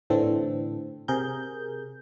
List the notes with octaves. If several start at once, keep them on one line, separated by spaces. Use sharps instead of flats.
A2 D3 E3 A3 C4 A4
C3 G#4 A#4 G6